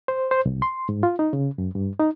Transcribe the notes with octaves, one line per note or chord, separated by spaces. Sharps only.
C5
C5
C2
C6
G#2
F4
D#4
C#3
F#2
G2
D#4